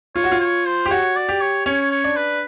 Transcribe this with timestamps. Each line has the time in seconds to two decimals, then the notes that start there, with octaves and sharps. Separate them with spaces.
0.16 F4 C#5
0.24 F#4
0.31 F4
0.40 C#5
0.66 C5
0.86 G4
0.91 F#4 C#5
1.16 D5
1.29 G4
1.41 C#5
1.66 C#4 C#5
1.91 C#5
2.04 D4
2.17 B4